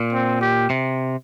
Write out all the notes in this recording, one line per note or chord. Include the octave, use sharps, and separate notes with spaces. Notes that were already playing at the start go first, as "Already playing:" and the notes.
Already playing: A#2
C4
G4
C3